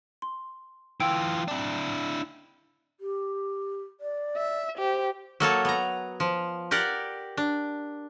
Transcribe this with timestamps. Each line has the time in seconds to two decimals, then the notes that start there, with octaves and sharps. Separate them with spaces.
0.22 C6
1.00 E3 F4 G5 E6
1.48 D4 E4
3.00 G4
4.01 D5
4.37 E5
4.78 G4 C5
5.40 F#3 A#3 A4 C#5
5.65 B3 A#5
6.20 F3
6.71 G4 A#4 D5 F#5
7.37 D4